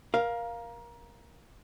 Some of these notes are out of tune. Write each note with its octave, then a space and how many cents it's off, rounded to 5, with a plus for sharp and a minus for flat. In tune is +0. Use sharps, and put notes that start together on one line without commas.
A#4 +20 F5 +0